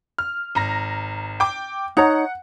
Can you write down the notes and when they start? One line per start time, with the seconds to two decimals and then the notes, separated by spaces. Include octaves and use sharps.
0.18 F6
0.55 G#1 A#5 A#6
1.40 G5 D6
1.97 D#4 C#5 F#5 A#5